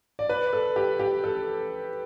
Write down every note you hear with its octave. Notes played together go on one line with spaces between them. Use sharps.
D5
B4
A4
G4
G4
A4